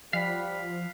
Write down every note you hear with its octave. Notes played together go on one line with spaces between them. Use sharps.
F3 G3 F5 F#5 B5